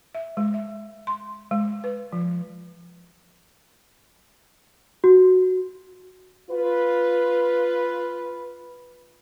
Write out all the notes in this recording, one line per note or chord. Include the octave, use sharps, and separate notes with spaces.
E5
G#3
E5
C6
G#3
B4
F3
F#4
F4 B4